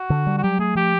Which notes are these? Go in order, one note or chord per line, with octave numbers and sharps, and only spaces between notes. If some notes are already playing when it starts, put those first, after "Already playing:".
Already playing: F#4
D3
G3
F#4
F#3 G4
A3 G#4
F3 G4